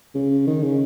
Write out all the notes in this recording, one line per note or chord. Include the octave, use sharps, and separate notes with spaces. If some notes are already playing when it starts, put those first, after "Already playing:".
C#3
D#3
C#3